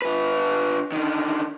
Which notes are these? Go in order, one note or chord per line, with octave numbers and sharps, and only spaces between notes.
D3 B4
D3 D#3